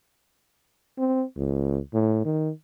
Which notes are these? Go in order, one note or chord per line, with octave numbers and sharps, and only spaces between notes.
C4
C#2
A2
D#3